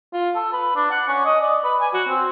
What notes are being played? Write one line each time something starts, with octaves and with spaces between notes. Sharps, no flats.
F4
A4
B4
D4
F#5
C#4
D#5
D5
B4
G#5
F#4
C4